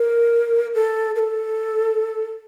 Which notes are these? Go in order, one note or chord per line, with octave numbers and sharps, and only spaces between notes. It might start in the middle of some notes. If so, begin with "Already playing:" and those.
Already playing: A#4
A4
A#4
A4